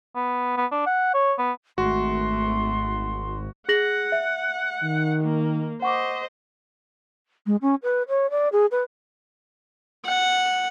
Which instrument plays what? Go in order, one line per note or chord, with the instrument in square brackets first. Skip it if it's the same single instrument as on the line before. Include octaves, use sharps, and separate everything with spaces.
[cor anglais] B3
B3
D4
F#5
C#5
B3
[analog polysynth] G#1 [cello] A3 [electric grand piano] F#4 [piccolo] C6
[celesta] G#4 A#6 F#7 [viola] F#5
[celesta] E5
[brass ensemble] D#3
[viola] A#3
[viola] C5 D#5 [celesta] F#5 C#6 D6
[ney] G#3
C#4
B4
C#5
D5
G#4
B4
[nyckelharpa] F#5